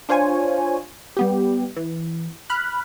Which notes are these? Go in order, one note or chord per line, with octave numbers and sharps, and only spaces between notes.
D4 F4 C5 C#5 G#5
G3 B3 G4
E3
B5 F6 F#6